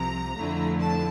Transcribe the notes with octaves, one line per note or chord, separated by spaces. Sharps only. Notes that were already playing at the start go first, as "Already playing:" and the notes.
Already playing: C2 C3 F3 A#5
F2 D3 F3 A3 E4
A5